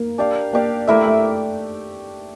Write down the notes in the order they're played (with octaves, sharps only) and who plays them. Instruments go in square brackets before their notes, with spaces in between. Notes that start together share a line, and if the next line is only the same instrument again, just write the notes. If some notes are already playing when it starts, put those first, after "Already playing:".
Already playing: [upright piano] A#3
[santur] D4 G4 D5 F5
[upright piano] A#3 [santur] D4 G4 D5 F5
[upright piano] A3 [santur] A#3 E4 A#4 E5
[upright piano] A3